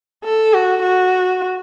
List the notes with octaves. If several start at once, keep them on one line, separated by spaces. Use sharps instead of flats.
A4
F#4
F#4